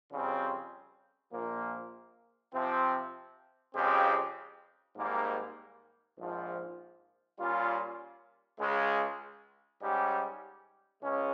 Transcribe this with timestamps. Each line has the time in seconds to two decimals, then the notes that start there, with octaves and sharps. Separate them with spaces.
0.12 F2 C#3 G3 C4
1.33 A#1 A#2 F3 A#3
2.54 C3 F3 C4
3.75 F2 C#3 G#3 C4 G4
4.96 G#1 G#2 G3 A#3
6.18 A#1 G#2 F3
7.39 A#2 G3 C#4 F4
8.59 C#2 C#3 G#3
9.81 G#2 G3 C#4 G4
11.02 C#2 C#3 G#3 C#4